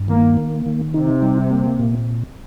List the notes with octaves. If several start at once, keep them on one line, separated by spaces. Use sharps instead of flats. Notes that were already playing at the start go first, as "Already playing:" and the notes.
Already playing: G2
D#3 A#3
A#3
D#3
C3 D#4
G3
A#3
A#2